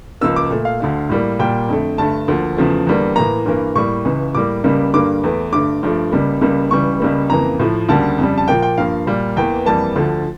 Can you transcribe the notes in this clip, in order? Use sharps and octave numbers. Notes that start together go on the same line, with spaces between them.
C#2 C#3 F3 A#3 E6
D6
A#2 A3
F5
D2 D3 A3
A2 G3 A#3
A#2 G3 A#3 G5
F2 D3 A3
G2 D3 A3 A5
D2 D3 F3 A#3
E2 C#3 F3 A3
E2 D3 G3 A#3
A2 E3 A#3 A#5
G2 E3 A#3
A2 G3 A#3 C#6
C#2 C#3 E3
A2 G3 A#3 D6
C#2 C#3 G3 A#3
G2 D3 G3 A#3 D6
E2 E3 A3
G2 D3 A3 D6
G2 F3 A3
C#2 C#3 G3 A#3
C#2 C#3 G3 A#3
C#2 C#3 E3 G3 C#6
C#2 C#3 G3 A#3
F2 C#3 E3 A#3 A#5
A2 F3 A3
D2 C#3 G3 A#3 A5
F2 C#3 G3
A5
A#2 F3 A#3 G5
G5
G2 F3 A#3 F5
A#2 G3 A#3
E2 E3 A#3 G5
F2 E3 G3 A#3 A5
D2 D3 F3 A3